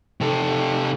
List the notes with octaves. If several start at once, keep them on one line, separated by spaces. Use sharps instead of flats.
C3 A4